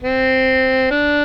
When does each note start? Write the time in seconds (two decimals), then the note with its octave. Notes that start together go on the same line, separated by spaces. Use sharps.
0.03 C4
0.91 D4